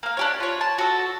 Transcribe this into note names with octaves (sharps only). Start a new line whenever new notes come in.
A#3 F5
D4 G4 C#5
F4 C#5
A5
F#4 A4